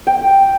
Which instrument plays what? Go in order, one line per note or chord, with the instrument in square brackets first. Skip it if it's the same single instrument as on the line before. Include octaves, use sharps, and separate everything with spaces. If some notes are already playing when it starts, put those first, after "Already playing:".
[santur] G5